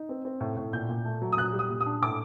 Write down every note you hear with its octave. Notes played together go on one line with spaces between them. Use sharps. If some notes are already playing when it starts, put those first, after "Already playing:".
Already playing: D#4
C4
C4
A2
A2
A#2 G6
A#2
A3
F#3
D#6
A#2 F#6
G3
D#6
A#2
D#6
D4
A2 D6